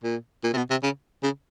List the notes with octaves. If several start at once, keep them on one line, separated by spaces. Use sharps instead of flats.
A#2
A#2
C3
B2
C3
C#3
C#3